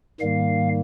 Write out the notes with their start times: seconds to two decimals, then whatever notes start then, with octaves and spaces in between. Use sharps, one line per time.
0.21 G#2 D#3 G3 A#3 F5